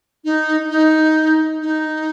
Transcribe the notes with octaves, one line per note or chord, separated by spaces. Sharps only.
D#4
D#4
D#4